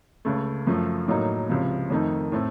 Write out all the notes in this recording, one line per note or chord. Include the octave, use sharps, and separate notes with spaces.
C#2 C#3 A3
F#2 F3 A3
A2 F#3 A#3 D#4
C#2 C3 F3
F2 D#3 A3 D#4
A2 A3 C4